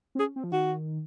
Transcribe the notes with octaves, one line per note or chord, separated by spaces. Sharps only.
C4
C#4 G#4
C4
F3
D#3 F#4